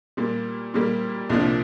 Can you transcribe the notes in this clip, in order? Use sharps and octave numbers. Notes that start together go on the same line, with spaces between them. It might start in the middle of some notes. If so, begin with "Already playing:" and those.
A#2 G3 A#3
A#2 G3 A#3
C2 A#2 F3 A#3 D4